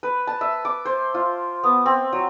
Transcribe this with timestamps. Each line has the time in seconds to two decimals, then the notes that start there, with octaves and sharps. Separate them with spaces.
0.03 B4
0.27 A5
0.41 E5
0.65 D6
0.85 C5
1.14 F4
1.64 B3
1.86 C4
2.13 F#3